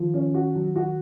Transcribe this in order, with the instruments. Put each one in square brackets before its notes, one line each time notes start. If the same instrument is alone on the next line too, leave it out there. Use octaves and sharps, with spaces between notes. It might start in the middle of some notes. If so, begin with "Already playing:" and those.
Already playing: [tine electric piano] D#3 [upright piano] F3
[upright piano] C#4
F#4
F#3
F#4